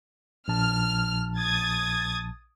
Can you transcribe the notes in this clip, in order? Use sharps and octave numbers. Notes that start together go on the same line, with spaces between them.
A#1 A5 F6
D#6 G#6 A6